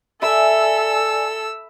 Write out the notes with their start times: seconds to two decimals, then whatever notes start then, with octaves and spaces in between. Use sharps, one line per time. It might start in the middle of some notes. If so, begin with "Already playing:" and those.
0.22 A4 D5 E5 G#5 B5 E6